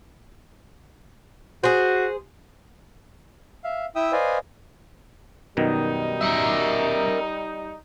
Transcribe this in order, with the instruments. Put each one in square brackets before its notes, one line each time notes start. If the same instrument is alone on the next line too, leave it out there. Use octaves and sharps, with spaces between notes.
[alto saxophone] F#4 [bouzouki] G#4 C5
[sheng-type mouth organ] E5 F5
E4 E5 G5 D#6 E6
B4 C5 D5 D#5 F5 G#5
[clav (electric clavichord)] F#2 B2 D#3 [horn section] G3 D#4
[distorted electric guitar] A#4 E5